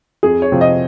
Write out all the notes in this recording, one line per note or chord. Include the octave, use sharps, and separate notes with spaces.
F2 G#4
C#5
C3 F3 C4
D#5